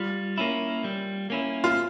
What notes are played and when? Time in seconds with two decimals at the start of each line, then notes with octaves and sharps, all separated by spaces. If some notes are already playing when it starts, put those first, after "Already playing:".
Already playing: G3 F4
0.38 A#3 C#4 E4
0.84 G3
1.30 A#3 C#4 E4
1.64 F4